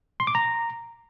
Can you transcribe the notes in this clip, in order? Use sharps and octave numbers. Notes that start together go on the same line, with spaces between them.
C6
D6
A#5